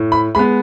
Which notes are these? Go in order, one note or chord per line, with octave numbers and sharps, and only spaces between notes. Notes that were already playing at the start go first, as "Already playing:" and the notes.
Already playing: A2
B5
G#3 B3 B5